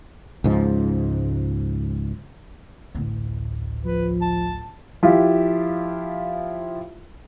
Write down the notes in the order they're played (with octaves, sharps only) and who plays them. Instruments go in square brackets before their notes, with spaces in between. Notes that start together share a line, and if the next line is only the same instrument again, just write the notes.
[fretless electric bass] C#2 G#2 F3
[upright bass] A1 D2
[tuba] F3 [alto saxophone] B4
[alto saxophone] A5
[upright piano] F3 E4 F4 G4